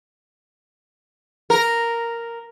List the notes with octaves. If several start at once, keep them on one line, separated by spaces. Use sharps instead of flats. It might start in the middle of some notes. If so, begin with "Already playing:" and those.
A#4